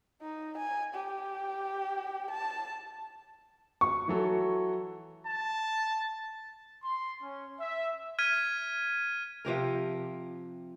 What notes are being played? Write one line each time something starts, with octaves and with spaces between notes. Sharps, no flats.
D#4
G#5
G4
A5
C#6
E3 F#3 A4
A5
C6
C#4
E5
F6 G#6 B6 D#7
C3 F3 G4 A#4